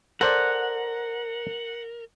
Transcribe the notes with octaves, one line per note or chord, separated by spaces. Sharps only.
A4 A#4 C5 D5 F#5